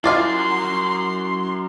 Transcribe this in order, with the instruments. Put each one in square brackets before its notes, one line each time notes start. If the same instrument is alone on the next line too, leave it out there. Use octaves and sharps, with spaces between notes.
[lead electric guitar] F#2 G#5 [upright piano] E4 [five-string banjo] F4 D5 F5 [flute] C6